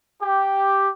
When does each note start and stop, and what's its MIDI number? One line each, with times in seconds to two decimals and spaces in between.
0.23 0.89 67